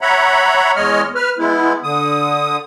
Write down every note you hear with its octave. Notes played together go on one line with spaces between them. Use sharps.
C#5 E5 F#5 A#5 B5
E2 G#3 C#5 D#5 F6
B4 F6
G#3 B3 E4
D3 D#6